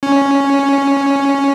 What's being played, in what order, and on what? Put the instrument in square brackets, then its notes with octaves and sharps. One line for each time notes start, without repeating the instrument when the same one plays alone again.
[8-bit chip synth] C#4